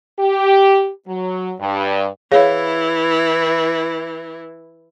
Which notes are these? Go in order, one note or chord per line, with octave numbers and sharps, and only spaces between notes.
G4
F#3
G2
E3 E4 G#4 C#5 F5